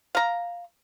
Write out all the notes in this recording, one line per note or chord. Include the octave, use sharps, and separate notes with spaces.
F5 A#5